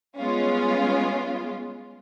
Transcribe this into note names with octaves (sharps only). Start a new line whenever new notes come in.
G3 G#3 B3 C#4 F4